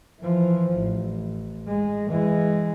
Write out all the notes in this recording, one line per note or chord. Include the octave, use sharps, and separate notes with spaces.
E3 F3
A1
G#3
E3 G#3